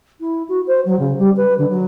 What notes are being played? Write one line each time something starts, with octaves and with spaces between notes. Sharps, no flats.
E4
F#4
C5
F#3
C#3
G3
B4
D3
F#3